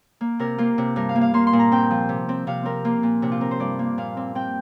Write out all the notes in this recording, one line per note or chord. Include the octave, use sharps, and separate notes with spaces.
A#3
C3 A#4
A#3 F4
C3
G2 A#4
F5
A#3
F5
A#3 C6
C6
A#2
A#5
C4 G5
F3
C3
C4
C3 F5
C4 A#4
A#3 F4
A#2
C3 D4
F4
C4 A#4
C5
G2 D5
A#3
A#2 F5
C4
C4 G5